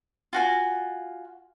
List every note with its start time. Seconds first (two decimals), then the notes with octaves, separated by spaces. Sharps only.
0.33 F4 F#4 G#5